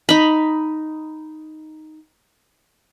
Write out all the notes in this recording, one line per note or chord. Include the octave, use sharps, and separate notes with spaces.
D#4 B5